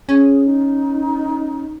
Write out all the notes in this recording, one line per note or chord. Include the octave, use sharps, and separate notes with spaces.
C#4 G#4
D#4